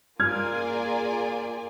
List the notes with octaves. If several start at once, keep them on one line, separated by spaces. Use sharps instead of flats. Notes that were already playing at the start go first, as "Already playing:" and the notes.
A#3 F4 G#4 D5 G#5 F6 G#6